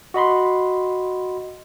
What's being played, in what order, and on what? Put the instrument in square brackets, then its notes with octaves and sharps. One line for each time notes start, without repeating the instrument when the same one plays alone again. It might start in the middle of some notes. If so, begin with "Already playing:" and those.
[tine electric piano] F#4 D#5 B5 C6